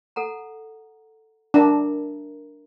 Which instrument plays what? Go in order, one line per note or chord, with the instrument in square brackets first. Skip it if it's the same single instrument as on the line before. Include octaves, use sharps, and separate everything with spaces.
[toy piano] A4 F#5 A#5
[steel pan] D4 [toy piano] A#4 E5 A#5